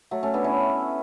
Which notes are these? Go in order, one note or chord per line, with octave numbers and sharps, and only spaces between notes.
F#3 A3
A3 C#4
B3 D4
C#4 E4